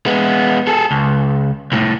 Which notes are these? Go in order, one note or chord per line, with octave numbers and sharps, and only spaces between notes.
G#3 B3
G#4 A4
C#2
C2 A2